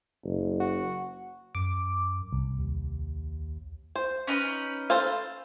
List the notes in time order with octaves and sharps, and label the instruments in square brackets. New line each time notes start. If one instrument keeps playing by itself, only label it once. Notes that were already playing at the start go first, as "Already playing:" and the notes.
[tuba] F#1
[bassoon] F#4
[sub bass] F#2 [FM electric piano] D6
[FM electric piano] C2
[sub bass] D#2
[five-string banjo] C5
[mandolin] C#4 D#4 B4
[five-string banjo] A4 C5 F5